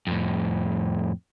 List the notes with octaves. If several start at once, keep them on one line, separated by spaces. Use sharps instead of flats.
F2 A2